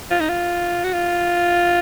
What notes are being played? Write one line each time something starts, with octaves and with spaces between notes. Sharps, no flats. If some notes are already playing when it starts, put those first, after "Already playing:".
F4
D#4
F4
F#4
F4